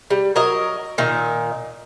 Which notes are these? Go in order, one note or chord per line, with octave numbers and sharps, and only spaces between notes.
G3
F#3 A#4 D#5
A#2 D#3